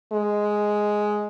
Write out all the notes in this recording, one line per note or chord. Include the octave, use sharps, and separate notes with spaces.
G#3